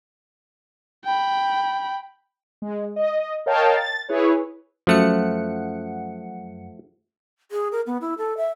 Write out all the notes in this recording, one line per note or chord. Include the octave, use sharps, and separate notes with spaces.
G5 B5
G#3
D#5
A#4 C#5 D#5 F5 G5 A5
A6
E4 G#4 B4 C#5
F#2 F3 A3 F#5 C#7
G#4
A#4
B3
E4
A4
E5